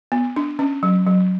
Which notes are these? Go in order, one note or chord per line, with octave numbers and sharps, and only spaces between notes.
B3
D4
C#4
F#3
F#3